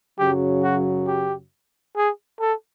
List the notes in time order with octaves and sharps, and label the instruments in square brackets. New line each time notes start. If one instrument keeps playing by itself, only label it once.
[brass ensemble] F#2 C#3 F#3 [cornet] G4
[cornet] F#4
G4
G#4
A4